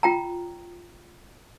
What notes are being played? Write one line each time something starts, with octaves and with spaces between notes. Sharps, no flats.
F4 G5 A#5